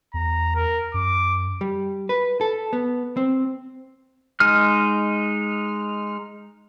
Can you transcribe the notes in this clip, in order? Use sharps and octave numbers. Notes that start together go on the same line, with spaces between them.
E2 A#5
A#4
F#2 D6
G3
B4
A4
B3
C4
G#3 D#4 F6